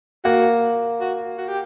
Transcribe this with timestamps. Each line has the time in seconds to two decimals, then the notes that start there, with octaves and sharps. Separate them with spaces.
0.24 A#3 F#4
1.00 F#4
1.38 F#4
1.48 G4